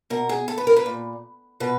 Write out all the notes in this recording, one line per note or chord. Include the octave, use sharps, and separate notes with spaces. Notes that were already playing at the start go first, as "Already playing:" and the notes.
B2 A#4
G#4
A4
B4
A#4
B4
A#2
B2 B4